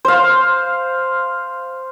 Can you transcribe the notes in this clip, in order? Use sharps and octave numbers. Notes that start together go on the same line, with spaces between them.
C5 F5